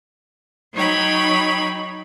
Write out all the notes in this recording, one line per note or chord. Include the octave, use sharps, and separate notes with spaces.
F#3 D#4 C#5 G5 B5